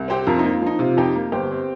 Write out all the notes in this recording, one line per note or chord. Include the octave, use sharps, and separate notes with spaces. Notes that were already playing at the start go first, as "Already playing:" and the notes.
Already playing: C2
C4 G4 C5
F2 F4 A#4
A#3 D#4
F4
F3 D#4
C3 F4
F2 D#4 G4
A#3
G1 G4 C5
C4